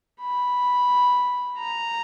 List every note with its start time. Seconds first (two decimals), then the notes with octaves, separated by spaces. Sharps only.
0.21 B5
1.59 A#5